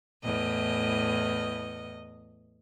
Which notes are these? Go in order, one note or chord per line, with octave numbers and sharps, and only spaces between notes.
E2 A2 D#5